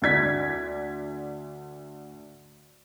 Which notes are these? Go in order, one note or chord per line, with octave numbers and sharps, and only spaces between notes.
D2 D5 G#6 B6